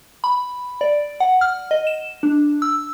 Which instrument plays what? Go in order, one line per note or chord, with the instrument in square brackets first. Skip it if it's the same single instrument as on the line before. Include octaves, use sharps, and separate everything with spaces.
[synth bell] B5
D5
F#5
F6
D#5
E7
D4
E6